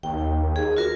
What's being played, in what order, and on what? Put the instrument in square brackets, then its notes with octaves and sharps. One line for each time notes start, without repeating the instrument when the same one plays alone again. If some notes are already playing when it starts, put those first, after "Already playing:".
[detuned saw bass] D#2 [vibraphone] G5
[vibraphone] G#4
F4 F#4 A#4